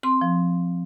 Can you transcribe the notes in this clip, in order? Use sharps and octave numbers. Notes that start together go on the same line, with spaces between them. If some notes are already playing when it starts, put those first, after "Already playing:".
C4 C6
F3